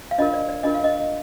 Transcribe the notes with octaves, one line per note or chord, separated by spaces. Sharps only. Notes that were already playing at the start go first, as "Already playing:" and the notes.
F5
D4 F4 A#4 D#5
D5
D5
D4 F4 A#4 D#5
F5
D#5